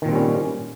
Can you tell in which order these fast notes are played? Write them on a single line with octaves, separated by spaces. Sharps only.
D#3 A#2 C4 G3 C#4